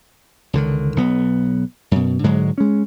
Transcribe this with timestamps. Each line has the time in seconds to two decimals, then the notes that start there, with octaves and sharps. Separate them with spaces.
0.53 C#2 D3 D#3
0.96 B1 B3
1.91 F#2 B2
2.24 G#2 D3 F#3 G#3
2.58 G#3 C#4